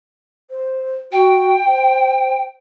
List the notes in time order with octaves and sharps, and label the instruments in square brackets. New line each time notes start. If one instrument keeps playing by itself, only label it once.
[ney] C5
[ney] F#4 [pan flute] G5
[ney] C5